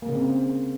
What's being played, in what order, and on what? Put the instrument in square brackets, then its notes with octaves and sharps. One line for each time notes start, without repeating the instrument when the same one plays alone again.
[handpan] A#3
C#3
C4